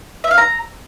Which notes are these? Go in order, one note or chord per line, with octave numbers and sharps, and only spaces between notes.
E5
F5
A#5